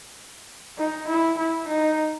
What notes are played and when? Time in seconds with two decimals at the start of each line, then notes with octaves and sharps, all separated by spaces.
0.78 D#4
1.08 E4
1.38 E4
1.68 D#4